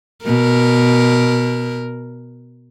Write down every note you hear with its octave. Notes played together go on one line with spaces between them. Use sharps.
B2 A#4